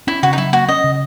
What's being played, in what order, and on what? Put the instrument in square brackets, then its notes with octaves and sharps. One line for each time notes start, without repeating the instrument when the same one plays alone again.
[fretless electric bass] C#4 [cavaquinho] E4
[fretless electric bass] C#3 [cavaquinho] F#4
[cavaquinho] D#4
[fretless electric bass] F#3 [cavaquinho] E4
[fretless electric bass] A#3 [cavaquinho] F#4
[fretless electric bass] C#4 [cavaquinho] D#5
[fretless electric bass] C#3